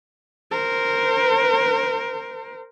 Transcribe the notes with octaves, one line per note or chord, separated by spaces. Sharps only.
A#4 C5